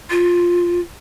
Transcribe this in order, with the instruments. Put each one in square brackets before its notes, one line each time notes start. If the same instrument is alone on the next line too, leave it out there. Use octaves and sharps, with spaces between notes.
[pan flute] F4